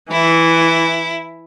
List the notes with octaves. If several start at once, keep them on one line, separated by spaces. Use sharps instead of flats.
E3 E4